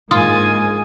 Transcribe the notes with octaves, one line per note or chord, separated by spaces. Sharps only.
G#2 G#3 A#3 F4 G#5 D#6